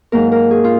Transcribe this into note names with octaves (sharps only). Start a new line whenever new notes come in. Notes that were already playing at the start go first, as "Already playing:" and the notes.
G#2 F#3 A#3 A#4
A#4
G#4
F4